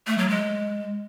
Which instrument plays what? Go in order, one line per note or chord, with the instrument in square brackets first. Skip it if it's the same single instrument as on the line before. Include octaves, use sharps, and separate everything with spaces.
[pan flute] A3
F#3
G#3